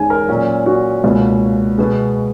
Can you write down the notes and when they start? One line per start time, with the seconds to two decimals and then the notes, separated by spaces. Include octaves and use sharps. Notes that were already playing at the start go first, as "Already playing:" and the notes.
Already playing: E2 D#3 G#3 C#4 G#5
0.10 A#4
0.28 A#2 F#3 C#4
0.66 F#4
1.03 C#2 B2 A#3 C#4
1.78 B2 G#3 B3